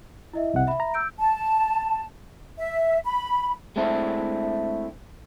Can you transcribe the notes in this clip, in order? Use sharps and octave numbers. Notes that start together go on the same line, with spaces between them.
E4 D#5 E5
C2 C3 F#5
E5 B5
A#5
E6 G6 D7
A5
E5
B5
G#3 A3 C4 D4 E4